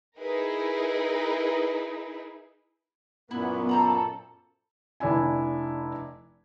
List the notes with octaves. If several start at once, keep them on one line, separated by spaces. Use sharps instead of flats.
D#4 E4 G#4 A#4 B4
F#2 A#2 B3 E4 B5
A4 C5 A#5 B5
F1 D4 E4 G#5